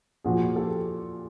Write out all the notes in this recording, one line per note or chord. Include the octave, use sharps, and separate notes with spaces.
A#2 F3 F#4 G#4
G4 A4